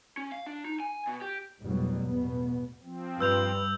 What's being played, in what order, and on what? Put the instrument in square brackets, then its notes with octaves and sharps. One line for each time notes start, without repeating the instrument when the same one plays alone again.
[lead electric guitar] C#4
F5
D4
D#4
G#5
B2
G4
[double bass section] F1 G#2 B2 F#3 G3
A1 E2 B2 B3
[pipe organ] F3 C4
[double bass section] G2 [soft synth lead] B4 [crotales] E6 G6 F7